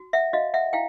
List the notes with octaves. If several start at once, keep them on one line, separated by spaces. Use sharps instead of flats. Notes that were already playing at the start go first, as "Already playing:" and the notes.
Already playing: F#4
E5 F#5
F#4 D#5 F5
E5 F#5
E4 F5 G5